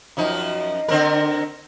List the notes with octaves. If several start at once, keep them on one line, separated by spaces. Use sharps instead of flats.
F#2 F3 D#4
D3 C4 A#4